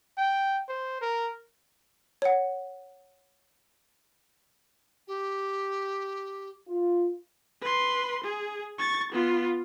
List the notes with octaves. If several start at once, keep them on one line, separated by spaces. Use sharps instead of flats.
G5
C5
A#4
C#5 F#5
G4
F4
B4 C6
G#4
C#6 A6
B3 F4